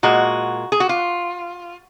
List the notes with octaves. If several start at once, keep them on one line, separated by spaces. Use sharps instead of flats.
A#2 G#3 F#4
G#4
F#4
F4